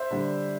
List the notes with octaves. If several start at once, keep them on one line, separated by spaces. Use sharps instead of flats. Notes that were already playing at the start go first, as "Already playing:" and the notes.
Already playing: C5 E5
D3 G3